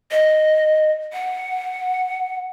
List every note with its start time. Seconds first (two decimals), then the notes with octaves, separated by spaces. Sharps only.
0.12 D#5
1.13 F#5